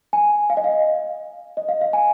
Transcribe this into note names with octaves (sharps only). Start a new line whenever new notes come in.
G#5
F5
D#5
F5
D#5
F5
F5
G#5